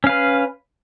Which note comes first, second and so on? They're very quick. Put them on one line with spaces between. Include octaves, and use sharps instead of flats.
C#4 F5 B4